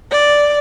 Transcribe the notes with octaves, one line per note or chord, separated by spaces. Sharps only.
D5